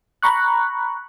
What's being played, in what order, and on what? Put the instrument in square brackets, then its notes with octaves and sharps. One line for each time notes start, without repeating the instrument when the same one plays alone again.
[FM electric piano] A#5 B5 C#6 F#6